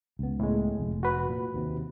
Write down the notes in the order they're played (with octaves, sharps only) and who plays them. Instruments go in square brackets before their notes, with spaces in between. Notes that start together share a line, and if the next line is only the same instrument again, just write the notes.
[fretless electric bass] C#2 B3
[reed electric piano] A2 G#3
[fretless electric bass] F1
[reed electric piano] F#4 B4
[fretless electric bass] A#2
D#2 C3